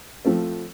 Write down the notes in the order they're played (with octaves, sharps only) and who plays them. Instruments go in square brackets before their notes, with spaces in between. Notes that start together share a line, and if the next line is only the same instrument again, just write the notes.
[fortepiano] F3 A3 C4